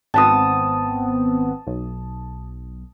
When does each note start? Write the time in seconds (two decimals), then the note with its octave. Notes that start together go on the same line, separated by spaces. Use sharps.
0.14 G#1 B3 C4 A5 D#6
1.67 B1